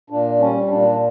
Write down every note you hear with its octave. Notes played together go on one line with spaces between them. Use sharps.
A#2 D4
G3 C#4
C#4
A#2 D4